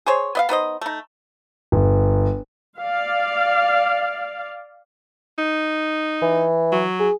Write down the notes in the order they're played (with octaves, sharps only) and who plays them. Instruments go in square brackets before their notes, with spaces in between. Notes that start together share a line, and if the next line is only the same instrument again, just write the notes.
[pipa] G#4 C5 C#5
B3 D#5 F5
B3 D#4 C5 D#5
A3 D#4
[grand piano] G1
[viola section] D5 F5
[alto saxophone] D#4
[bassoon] E3
[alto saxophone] F#3
[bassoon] G#4